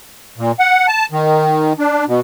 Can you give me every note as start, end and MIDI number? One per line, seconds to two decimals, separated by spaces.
0.38 0.52 46
0.59 0.86 78
0.88 1.06 81
1.12 1.73 51
1.79 2.05 62
2.08 2.20 47